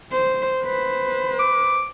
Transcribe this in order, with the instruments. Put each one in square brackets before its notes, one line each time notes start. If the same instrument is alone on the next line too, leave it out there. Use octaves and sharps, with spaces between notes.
[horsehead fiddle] C5
B4 C5
[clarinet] D6